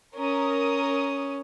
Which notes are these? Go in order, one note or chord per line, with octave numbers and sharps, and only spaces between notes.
C#4 A#4 D#6